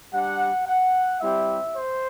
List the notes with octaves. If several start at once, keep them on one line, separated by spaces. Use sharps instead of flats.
G3 D4 G4 F#5
F#5
G3 C4 E4 G4 E5
C5